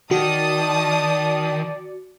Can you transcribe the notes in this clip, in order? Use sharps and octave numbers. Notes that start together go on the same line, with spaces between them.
D#3 F#4 D5 A5 D#6